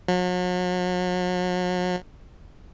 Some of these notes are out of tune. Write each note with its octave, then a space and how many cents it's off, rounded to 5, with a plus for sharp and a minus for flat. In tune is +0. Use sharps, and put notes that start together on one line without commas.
F#3 -40